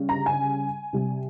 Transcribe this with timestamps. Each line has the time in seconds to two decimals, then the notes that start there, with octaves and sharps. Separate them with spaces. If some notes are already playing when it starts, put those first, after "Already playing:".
Already playing: C#3 G3
0.09 A#5
0.26 G#5
0.93 C3 G3